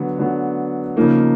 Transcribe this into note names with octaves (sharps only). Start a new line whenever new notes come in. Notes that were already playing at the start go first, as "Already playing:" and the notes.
Already playing: D3 F#3 B3
D3 F#3 B3
C#3 F3 A#3 D#4